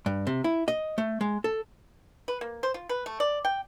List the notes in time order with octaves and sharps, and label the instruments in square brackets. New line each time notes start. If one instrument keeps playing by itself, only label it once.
[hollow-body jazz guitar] G2
C3
E4
D#5
A3
G#3
A4
[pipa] B4
A#3
C5
F4
B4
A3
D5
G5